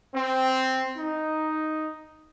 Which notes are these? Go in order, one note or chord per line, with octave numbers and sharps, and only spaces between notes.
C4
D#4